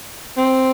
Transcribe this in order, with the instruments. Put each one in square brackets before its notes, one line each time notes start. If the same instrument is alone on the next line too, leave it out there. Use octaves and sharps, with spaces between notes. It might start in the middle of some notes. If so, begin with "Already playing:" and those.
[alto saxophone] C4